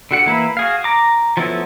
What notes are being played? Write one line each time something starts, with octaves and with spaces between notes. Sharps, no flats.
D3 F#4 F#5
E3 A#3 E5 B5
F#4 G#4 F5
A#5 D6
F3 F#3 A3 B3 E4